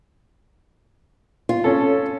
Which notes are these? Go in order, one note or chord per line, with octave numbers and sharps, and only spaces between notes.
F4
C#4 A4